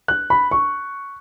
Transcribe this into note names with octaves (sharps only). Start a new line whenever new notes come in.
F#6
B5
C#6